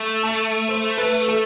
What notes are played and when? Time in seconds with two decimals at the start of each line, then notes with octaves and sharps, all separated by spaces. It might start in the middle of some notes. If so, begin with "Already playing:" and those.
Already playing: A3
0.23 A5
0.68 C5
0.98 B4
1.28 A4